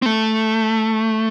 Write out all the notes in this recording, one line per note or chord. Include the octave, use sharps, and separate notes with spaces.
C4
A3